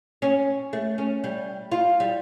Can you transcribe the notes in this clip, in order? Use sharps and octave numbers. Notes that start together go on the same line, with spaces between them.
C#4
A3
C#4
G3
F4
G3